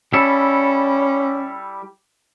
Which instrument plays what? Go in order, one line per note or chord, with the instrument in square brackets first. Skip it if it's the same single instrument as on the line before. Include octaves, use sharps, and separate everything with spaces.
[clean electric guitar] G3 E4 A4 [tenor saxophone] C#4